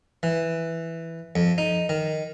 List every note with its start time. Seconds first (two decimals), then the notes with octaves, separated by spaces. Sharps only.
0.23 E3
1.36 F2
1.58 D#4
1.89 D#3